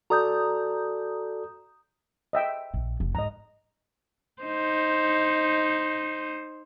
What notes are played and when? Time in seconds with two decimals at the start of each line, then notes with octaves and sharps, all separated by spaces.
0.10 F#4 A4 D5 A#5 D#6 G6
2.33 D#5 E5 G5
2.74 A#1
3.00 F1
3.15 G#2 D#5 A#5
4.42 D#4 C5